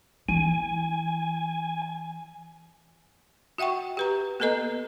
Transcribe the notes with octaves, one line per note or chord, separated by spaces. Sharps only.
E3 G#5
F#4 E5 F#5 G5 C#6
G4 B4 A#5
A#3 B3 A4 B4 D#5 A#5